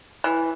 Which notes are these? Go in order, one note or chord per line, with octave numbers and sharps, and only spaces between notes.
E3